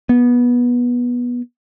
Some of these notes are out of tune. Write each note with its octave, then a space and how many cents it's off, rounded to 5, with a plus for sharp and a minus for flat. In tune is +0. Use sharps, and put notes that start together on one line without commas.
B3 -20